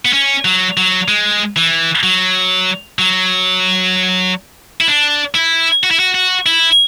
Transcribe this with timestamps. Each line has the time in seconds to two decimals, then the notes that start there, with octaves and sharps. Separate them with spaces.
0.05 B3
0.13 C#4
0.45 F#3
0.77 F#3
1.08 G#3
1.56 E3
2.03 F#3
2.99 F#3
4.81 E4
4.88 D4
5.35 E4
5.83 F#4
5.91 E4
6.00 F#4
6.14 F#4
6.46 E4